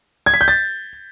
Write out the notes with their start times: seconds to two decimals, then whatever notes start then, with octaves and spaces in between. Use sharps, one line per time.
0.26 G#6
0.34 B6
0.41 G6
0.48 A6